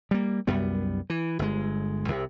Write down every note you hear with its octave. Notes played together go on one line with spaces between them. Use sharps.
G3 A#3
C2 F#2 G3 B3
E3
G1 G#3
C2 C3